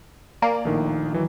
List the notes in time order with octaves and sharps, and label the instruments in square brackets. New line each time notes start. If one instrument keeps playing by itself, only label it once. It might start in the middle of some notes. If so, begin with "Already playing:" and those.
[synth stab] A#3 [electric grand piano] D5 G#5
[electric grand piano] A#1 A2 D#3
D#3 E3 F#3